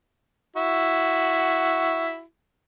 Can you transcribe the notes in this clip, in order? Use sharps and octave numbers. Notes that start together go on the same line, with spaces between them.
E4 F#4